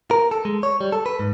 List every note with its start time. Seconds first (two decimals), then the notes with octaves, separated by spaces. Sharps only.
0.11 A#4
0.31 A4
0.45 G#3
0.63 C#5
0.81 G3
0.92 A4
1.06 B4
1.20 G#2